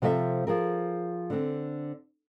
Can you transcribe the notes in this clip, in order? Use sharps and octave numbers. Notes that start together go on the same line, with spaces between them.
C3 F3 A4 D5 E5
F3 G#4 A#4
D3 C4